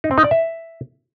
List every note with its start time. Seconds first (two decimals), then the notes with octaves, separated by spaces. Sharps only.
0.04 D#4
0.11 C4
0.18 D#4
0.24 D5
0.31 E5